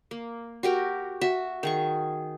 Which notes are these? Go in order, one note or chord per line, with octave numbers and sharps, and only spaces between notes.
A#3
F#4 G4 A#4 G5
F#4 E5
D#3 G#4 C#6